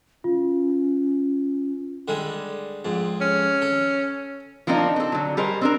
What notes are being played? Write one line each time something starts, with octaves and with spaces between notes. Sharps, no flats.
C#4 F4
D3 G3 G#3
F2 G#2
C#4
A4
F3 A#3 C4 D4 D#4
C4 A4
D3 F#3
G3 G#4 A#4 C5 D#5
C4 D4 A#4